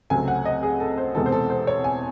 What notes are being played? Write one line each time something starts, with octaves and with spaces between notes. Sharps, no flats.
C#2 C3 F#3 A3 C4 G#5
F#5
D#5
G#4
A4
C5
E1 E2 C3 E3 G#3 A4
C5
A4
C5
C#5
G#5